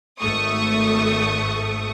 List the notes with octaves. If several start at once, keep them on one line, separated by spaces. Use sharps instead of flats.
G#1 A3 C#6 D#6